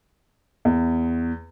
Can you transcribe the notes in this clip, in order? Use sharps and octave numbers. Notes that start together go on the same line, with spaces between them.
E2